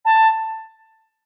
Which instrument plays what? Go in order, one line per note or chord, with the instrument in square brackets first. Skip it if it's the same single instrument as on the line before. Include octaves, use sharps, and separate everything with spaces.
[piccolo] A5